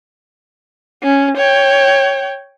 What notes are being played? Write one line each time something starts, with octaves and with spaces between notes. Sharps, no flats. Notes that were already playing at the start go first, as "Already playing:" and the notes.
C#4
C#5 G5